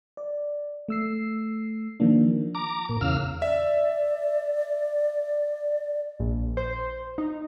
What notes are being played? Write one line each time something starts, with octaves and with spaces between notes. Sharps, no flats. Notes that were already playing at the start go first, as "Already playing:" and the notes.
D5
A3 E6 C7
D#3 F3 A#3 D4
A#5 D6
A#2
E2 C#3 F5 E6 F6
D5 E5
A#1
C5
D#4